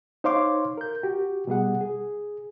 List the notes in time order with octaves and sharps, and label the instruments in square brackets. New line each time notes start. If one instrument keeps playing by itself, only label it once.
[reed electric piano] D#4 C5 C#5 F5 C6 D6
A#4 G6
F#4 G4
B2 G3 G#4 F#5
G#4